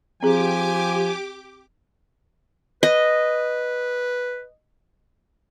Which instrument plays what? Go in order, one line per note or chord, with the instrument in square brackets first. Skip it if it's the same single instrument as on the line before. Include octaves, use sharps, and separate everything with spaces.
[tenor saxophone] F3 [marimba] C4 G#4 [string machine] G4 D6 [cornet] G#5
[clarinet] B4 [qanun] D#5